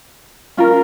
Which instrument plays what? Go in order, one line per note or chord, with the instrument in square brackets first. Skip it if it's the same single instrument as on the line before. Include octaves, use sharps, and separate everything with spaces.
[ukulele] C#4 F4 A#4